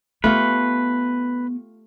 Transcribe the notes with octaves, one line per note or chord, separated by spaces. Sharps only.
A3 B3 F4 G4 B4